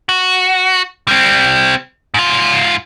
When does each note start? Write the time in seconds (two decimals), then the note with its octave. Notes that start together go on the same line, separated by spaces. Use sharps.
0.09 F#4
1.08 G3 C4
2.14 G#2 F4